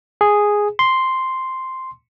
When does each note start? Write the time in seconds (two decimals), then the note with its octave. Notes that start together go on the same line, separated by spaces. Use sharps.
0.21 G#4
0.79 C6